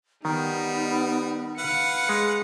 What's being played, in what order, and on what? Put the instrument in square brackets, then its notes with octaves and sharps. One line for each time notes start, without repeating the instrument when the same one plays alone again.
[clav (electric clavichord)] D#3 [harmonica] G3 [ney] B3 [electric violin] D#4
[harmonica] B4 F5 F#5 [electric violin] C#7
[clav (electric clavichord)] G#3 [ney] G#4